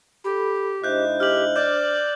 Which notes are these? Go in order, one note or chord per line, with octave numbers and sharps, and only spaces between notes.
G4 A4 B5
G#2 D4 E4 C5 D#5 F#6 G6
G4 F6 F#7
D5 D6 G6